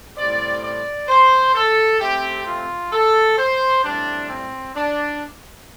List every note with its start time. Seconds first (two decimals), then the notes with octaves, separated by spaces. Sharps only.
0.16 A2 G3 C4 D5
0.62 D5
1.08 C5
1.54 A4
2.00 C3 A3 C4 G4
2.46 F4
2.92 A4
3.38 C5
3.83 A2 G3 C4 D4
4.29 C4
4.75 D4